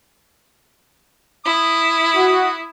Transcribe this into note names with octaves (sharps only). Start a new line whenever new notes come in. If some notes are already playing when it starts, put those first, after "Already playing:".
E4 D#6
F#4